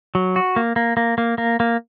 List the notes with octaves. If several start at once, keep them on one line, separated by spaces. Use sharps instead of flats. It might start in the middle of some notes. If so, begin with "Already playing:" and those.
F#3
F#4
A#3
A#3
A#3
A#3
A#3
A#3